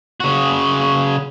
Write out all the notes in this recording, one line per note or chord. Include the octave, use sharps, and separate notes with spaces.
C#3 F#4